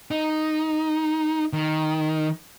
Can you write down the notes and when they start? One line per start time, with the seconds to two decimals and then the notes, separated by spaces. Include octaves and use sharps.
0.11 D#4
1.53 D#3